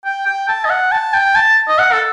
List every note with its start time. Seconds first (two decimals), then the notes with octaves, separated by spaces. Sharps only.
0.05 G5
0.26 G5
0.48 A5
0.65 D#5
0.70 F#5
0.92 A5
1.14 G5
1.35 A5
1.68 D#5
1.79 F#5
1.92 A4